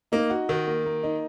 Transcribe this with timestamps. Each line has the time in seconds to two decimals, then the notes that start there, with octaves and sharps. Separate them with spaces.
0.12 A#3 D#4
0.30 F#4
0.49 D#3 F#4
0.67 A#3
0.85 A#3
1.03 D#4